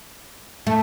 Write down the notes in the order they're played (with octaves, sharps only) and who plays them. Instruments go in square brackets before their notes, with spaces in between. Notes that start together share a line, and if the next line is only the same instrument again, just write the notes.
[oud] A3